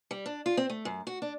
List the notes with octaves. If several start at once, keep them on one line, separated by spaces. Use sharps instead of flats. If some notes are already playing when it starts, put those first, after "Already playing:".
G3
D4
F4
C4
A3
F#2
F#4
D4